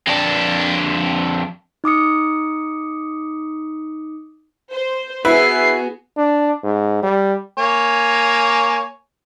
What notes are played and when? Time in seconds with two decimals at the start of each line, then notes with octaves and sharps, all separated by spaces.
0.07 F2 D4
1.84 D#4 D6 D#6 C#7
4.72 C5
5.25 B3 E4 F#4 G#4 B4 C7
6.18 D4
6.64 G#2
7.03 G3
7.58 A#3 C#5 G#5